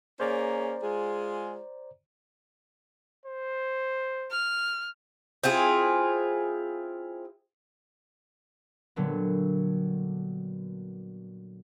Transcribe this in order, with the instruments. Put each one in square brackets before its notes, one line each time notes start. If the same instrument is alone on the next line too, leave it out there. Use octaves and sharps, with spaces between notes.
[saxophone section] A#3 C#4 G#4 [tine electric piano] C5 D5 A#5
[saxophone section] G#3 F4 G#4
[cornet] C5
[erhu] F6
[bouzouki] C4 E4 F4 G#4
[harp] A#2 D3 F#3 G3 B3